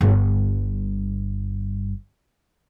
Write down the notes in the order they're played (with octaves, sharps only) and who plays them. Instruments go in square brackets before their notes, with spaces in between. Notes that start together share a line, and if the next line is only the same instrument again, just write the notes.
[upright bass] G1 G2